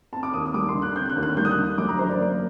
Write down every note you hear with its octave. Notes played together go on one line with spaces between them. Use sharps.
C4 A5
D6
D#2 D#6
D#6
G3 D6
C6
D3
F#6
C4 G6
F#6
D#2
F#6
G3 G6
D#6
F#6
D3
F#2 D6
A#5
F#2 C5
D5
A#3